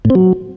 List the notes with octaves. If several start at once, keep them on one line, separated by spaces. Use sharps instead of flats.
A2
C4
F#3